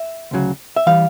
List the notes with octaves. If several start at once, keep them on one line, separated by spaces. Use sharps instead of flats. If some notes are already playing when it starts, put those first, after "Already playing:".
Already playing: E5
D2 C#3 F#3
E5
E3 G3 F5